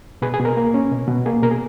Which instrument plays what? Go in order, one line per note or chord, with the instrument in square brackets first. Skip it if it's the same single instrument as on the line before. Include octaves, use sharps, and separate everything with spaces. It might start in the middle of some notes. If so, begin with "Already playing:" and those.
[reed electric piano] B2 G#4 B4
G#4
B2
A#4
A#3
C#4
B2
B2
A#3 G#4
B2 A#4
G#4